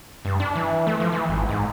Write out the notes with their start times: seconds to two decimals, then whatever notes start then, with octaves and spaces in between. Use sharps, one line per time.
0.25 G2
0.40 D4
0.56 E3
0.87 A3
1.00 F3
1.12 E3
1.29 G#1
1.49 G#2